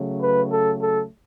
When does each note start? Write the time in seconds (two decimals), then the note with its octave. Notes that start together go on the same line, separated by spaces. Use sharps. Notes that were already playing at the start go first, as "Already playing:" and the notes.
Already playing: C#3 F#3 A3
0.21 B4
0.51 A4
0.80 A4